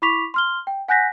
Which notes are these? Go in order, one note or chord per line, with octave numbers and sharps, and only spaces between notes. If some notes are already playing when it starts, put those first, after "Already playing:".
E4 B5 C#6 D6 B6 F7
C6 F6 G7
G5
F#5 G#5 F#6 G6 A#6 B6